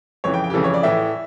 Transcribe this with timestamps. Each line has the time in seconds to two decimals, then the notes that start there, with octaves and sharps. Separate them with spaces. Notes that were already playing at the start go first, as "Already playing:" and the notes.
0.24 F2 C#3 E3 C#5
0.34 G5
0.44 G5
0.50 G4
0.54 F2 C#3 E3 A4
0.64 C#5
0.74 D5
0.83 A2 E3 E5